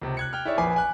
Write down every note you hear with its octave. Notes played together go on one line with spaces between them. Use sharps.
C#2 C3
F#6 G#6 C#7
G5 F6
E4 G#4 C#5 D5 E5
A#1 F2 B4 G#5 D6 C7
G#5 F#6